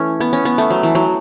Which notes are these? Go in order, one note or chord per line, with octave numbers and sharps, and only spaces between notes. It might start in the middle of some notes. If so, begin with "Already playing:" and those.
Already playing: E3 A3 C#4
B3
C#4
B3
A3
F#3
E3
F#3